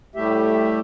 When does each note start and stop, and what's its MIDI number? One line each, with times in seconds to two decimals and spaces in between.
0.16 0.79 45
0.16 0.79 55
0.16 0.79 57
0.16 0.79 67
0.16 0.79 76